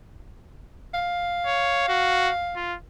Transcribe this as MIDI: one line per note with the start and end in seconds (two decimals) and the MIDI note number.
0.94 2.76 77
1.46 1.85 73
1.89 2.30 66
2.56 2.75 65